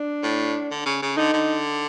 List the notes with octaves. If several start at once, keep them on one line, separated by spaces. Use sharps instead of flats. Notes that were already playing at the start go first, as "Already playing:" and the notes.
Already playing: D4
A2
D3
C#3
C#3
D3 D#4
D3